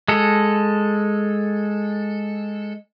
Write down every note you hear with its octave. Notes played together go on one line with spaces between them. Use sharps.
G#3 A4